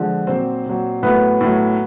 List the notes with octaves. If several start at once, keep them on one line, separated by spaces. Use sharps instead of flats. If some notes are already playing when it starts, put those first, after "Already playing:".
Already playing: D3 F3 G#3
A#2 F#3 C4 C5
A#2 F#3
A2 F#3 B3 B4
A2
F#3